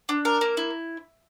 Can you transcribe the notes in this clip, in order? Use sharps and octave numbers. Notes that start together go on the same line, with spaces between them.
D4
A#4
A#3
E4